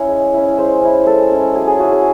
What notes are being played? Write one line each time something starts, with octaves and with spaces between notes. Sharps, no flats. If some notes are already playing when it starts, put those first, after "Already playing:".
Already playing: C#4 E4 C#5
G#3
C#4 E4
G#3 C5
C#4 E4
G#3 A4
C#4 E4
F#3 G#4
G#4
C#4 E4 F#4
G#4